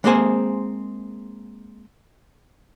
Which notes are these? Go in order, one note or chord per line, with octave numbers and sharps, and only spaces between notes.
G#3 A#3 C4 G#4 C5 G#5